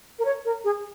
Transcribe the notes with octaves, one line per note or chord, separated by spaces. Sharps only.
A#4
C#5
A#4
G#4